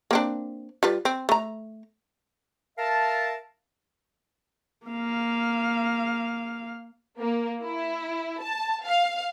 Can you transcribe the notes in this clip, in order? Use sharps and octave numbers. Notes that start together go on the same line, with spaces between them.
A#3 C4 D4
G3 F4 B4
C4
A3 A#5
A#4 E5 F5 A5
A#3 F5
A#3
E4
A5
F5